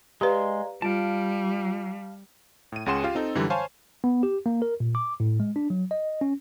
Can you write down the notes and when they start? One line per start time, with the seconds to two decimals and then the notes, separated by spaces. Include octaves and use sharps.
0.21 G#3 G4 B4 D5 F5 A#5 C6
0.82 G3 F4 F5 A5 D7
2.72 A2 D#7
2.86 C#2 C#4 G#4 F#5 C6 E7
3.04 F4 G4 F5
3.15 C4 D#4 A4
3.35 F#2 D3 E3 G3
3.50 C5 C#5 F5 G#5 A5
4.04 B3
4.23 G4
4.46 A#3
4.62 A#4
4.80 A#2
4.95 D6
5.20 A2
5.40 G#3
5.56 D4
5.70 F#3
5.91 D#5
6.21 C#4